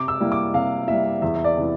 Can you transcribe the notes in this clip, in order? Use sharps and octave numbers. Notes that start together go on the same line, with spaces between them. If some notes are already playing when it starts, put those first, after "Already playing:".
Already playing: C3 D6
E6
G3 A#3 E4
D6
C3 F5
G3 A#3 E4 E5
E2 E5
E5
D5
C3 E3